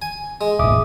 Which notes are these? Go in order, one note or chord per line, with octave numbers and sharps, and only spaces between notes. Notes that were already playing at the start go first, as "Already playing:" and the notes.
G#5
G#3
D#1 A1 E5 D6 D#6